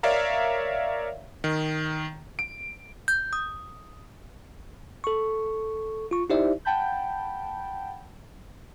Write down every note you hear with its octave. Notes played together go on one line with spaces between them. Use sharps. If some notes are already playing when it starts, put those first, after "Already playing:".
A#4 C#5 D5 E5 F5 A#5
D#3
D7
G6
D#6
A4 C#6
F4 C#6
D#4 E4 G4 C5 D5 E5
F#5 G5 A5 B5 G6